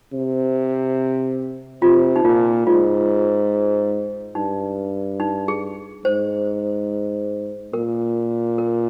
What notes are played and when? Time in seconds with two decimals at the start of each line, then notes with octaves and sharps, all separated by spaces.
0.12 C3
1.82 C3 F4
2.16 D#4
2.24 A#2 F4
2.67 G#2 F4
4.35 G2 D#4
5.20 D#4
5.48 G#4
6.05 G#2 C5
7.74 A#2 A#4
8.58 A#4